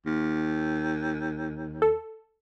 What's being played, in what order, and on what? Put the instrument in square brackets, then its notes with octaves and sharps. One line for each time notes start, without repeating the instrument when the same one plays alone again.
[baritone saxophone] D#2
[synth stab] A4